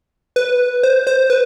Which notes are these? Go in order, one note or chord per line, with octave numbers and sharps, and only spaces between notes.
B4
C5
C5
B4